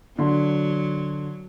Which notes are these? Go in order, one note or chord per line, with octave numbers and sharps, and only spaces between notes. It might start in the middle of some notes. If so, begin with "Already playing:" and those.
D3 F#3 C6